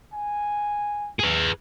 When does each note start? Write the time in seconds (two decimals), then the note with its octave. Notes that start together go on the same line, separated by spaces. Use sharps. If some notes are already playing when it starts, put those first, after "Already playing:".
0.13 G#5
1.20 G#4 B4